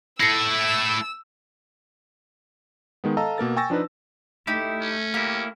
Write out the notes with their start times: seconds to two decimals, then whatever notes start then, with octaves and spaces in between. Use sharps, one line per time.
0.20 A3 E4 E6 A#6 C7 C#7
3.04 D#3 G#3 B3
3.17 A4 D#5 F5 A5 A#5 E6
3.38 B2 A#3 A#4 A6
3.57 G5 G#5 C#6 E6 A6 A#6
3.70 F3 D4 D#4 B4
4.47 A3 D#4 E4 G4
4.81 C#4
5.14 A#3 E4 G4